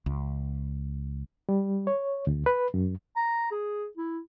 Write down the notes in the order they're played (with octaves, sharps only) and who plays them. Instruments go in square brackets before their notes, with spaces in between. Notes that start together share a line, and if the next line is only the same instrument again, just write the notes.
[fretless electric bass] C#2
[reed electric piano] G3
C#5
D2
B4
F#2
[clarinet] A#5
G#4
E4